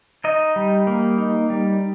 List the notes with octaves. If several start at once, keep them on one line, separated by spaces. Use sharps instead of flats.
D#4 D#5
G3
A#3
D#4
G3